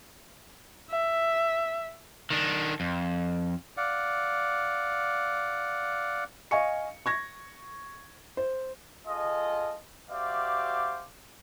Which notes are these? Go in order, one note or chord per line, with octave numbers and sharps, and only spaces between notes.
E5
D#3 D4
F2
D5 F5 F#5
D#5 F5 G#5 C#6 C#7
C#6 G#6 A#6
C5
F4 G#4 A4 D#5
F#4 G4 C5 D5 E5 F5